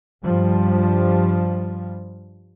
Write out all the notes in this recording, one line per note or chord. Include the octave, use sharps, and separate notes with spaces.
G2 F3 G3